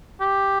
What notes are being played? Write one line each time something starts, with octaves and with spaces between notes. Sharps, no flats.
G4